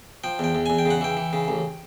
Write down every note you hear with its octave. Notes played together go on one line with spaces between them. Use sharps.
F3 G5
E2 G5
E2
E2 G#5
G5
C#3
F#5
E3 G5
E3
C#3
A1